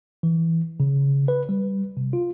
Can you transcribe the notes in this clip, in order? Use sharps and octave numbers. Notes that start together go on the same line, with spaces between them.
E3
C#3
B4
G3
C3
F4